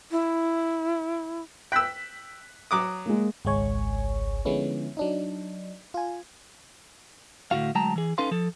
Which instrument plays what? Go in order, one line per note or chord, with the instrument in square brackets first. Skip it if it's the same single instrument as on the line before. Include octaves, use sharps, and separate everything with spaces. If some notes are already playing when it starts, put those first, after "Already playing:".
[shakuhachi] E4
[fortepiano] G5 E6 [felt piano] F#6 B6
[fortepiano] F#3 D6 D#6
[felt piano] G#3 A#3
[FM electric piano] G#1 C#2 G#3 C#5 G#5 C#6
D3 F3 G#3 B3 C#4 E4
F#3 D4 D#4
F4 G#5
[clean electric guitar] D2 A2 C3 F#4 F5
D2 F#3 G#3 G5 A5 A#5
E3 G#4
C#4 D#4 A4 B4 F5 C6
F3 A4